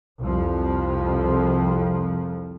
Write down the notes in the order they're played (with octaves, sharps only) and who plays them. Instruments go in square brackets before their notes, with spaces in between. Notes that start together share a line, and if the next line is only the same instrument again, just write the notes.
[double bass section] C2 F2 F3